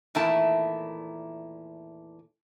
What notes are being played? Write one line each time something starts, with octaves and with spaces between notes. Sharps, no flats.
E2 A#2 D#3 A3 E4 A5